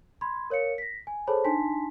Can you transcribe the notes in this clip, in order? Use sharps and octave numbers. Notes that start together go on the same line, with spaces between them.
B5 C6 G#6
A#4 C#5 F5 C#7
A#6 B6
G#5
G#4 A4 C5 C#5 A5 B5
D4 D#4 G#5 A5 C6 B6